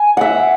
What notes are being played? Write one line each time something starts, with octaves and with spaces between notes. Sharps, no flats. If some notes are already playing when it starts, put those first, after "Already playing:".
Already playing: G#5
E5 F#5